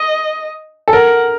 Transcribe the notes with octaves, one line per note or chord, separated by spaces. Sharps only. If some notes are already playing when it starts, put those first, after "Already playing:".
Already playing: D#5
A4
A#4 F#5